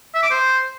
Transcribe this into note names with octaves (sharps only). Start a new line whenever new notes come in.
E5
D6
C5